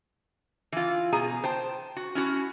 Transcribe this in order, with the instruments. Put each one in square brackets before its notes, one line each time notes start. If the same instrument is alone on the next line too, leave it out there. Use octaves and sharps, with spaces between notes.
[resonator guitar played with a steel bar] E3 F4
B2 G#4 G#5 A#5
C5 G5 A5
F#4
C#4 E4 F#4